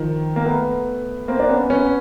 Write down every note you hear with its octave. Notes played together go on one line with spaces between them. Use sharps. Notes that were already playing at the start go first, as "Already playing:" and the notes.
Already playing: D#3 F3
A#3
A3 B3
A#3 C4
D4
B3 C#4
B3 C#4